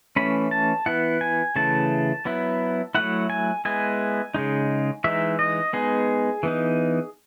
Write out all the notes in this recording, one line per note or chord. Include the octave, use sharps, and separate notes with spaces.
E3 A3 C#4 B5
A5
E3 B3 E4 F#5
G#5
C#3 E3 A3 E4 A5
F#3 B3 E4
F#3 A3 E4 F#5
G#5
G#3 B3 E4 G#5
C#3 G#3 D#4
E3 G#3 D#4 E5
D#5
G#3 B3 D#4 G#4
E3 B3 D#4